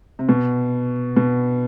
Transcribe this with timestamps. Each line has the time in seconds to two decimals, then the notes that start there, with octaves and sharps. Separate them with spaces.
0.19 C3
0.29 B2
1.17 B2